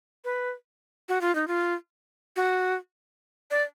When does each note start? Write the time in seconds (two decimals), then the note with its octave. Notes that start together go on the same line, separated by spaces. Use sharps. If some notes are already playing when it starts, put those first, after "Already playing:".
0.24 B4
1.09 F#4
1.21 F4
1.35 D#4
1.48 F4
2.36 F#4
3.51 D5